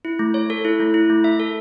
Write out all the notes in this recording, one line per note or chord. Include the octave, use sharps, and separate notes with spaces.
E4
A3
C#5
A4
E4
A3
E4
A3
E5
A4